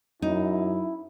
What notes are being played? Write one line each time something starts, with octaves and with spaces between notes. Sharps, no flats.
F#2 D#4 E4